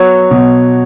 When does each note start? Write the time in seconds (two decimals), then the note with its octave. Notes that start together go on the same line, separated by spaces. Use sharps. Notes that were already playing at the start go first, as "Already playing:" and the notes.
Already playing: F#3 B3 C#5
0.31 B2